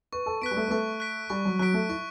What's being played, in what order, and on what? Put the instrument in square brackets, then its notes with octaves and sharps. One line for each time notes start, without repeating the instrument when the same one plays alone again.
[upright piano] B4 [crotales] C#6
[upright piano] A4
[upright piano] B3 [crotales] F#6 B6 D7
[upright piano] G3
A3
B3
[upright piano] A3 [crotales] C#6
[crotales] F#6 B6 D7
[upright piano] G3 [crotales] C#6
[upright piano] F#3
[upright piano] F#3 [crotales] F#6 B6 D7
[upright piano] A3
[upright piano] E4 [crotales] C#6